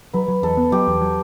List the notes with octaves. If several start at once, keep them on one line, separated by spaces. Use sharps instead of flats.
F#3 B4
F#3
E2 A4
B3
F#3 G4
E2
F#3